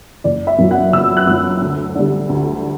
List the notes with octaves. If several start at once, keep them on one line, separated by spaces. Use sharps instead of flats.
F#1 D5
E5
F#2 F#3
F#5
F#1 E6
F#6
F#2 F#3 E6
D2
D3 G3
D2